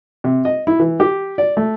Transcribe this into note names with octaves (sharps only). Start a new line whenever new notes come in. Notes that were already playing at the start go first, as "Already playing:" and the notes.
C3
D#5
E4
E3
G4
D5
A3